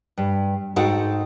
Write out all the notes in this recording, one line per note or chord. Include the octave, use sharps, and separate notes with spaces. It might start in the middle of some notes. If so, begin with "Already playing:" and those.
G2
G#2 D#4 F#4 A4 F#5 G5